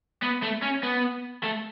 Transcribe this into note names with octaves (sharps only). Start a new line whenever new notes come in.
B3
A3
C#4
B3
A3